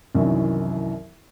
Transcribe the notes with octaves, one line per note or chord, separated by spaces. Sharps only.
C2 F#2 D#3 E3 F#3